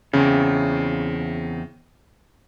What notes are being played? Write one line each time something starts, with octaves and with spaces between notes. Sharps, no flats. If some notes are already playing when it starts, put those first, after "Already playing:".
E2 C#3 C4